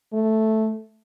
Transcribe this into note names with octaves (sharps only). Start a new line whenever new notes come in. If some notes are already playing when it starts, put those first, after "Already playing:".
A3